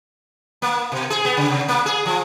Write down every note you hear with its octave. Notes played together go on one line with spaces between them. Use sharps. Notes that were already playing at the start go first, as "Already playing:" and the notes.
A#3
B2
G#4
B3
C#3
C3
A#3
G#4
F3